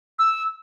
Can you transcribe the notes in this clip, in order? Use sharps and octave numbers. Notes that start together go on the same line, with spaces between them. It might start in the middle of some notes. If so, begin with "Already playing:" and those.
E6